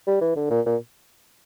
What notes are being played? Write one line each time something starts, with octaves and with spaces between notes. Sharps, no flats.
G3
E3
D3
A#2
A#2